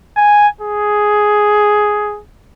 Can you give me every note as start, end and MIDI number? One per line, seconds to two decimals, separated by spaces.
0.17 0.48 80
0.61 2.19 68